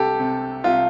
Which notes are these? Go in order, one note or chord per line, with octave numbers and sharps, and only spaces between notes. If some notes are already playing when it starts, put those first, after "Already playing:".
Already playing: C2 G4 A4
C3
C2 F4